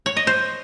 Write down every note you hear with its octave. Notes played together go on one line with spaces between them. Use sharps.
C#5
D#5
C5